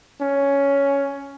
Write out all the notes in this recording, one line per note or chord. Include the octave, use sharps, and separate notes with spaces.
C#4